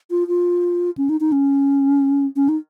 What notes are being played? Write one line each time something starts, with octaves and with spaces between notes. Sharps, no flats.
F4
F4
C#4
D#4
D#4
C#4
C#4
D#4